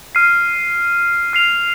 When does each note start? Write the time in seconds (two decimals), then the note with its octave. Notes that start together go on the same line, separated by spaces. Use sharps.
0.15 F6 C7 D#7
1.33 F6 C7 F7